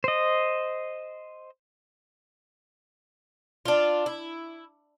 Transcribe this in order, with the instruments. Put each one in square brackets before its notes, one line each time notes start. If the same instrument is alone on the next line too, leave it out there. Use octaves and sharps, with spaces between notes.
[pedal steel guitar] C5 D#5
[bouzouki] D4 F4
E4